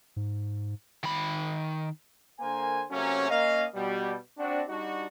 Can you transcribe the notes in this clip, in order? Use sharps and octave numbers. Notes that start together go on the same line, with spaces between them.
G#2
D#3 B5
D3 A#3 A#4 C5 G#5
C3 F#3 A3 A#3 C#4
A#3 C#4 D#5 F5
B2 G3
C4 D4 F#4
G3 D4 D#4 F#4